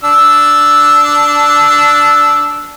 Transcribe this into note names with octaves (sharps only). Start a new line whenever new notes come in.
D4 E6